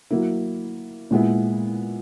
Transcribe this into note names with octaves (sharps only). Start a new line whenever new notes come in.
F#3 A#3 E4
A#2 G#3 B3 E4